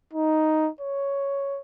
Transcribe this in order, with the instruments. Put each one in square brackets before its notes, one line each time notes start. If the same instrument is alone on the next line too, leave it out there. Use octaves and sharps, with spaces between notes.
[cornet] D#4
C#5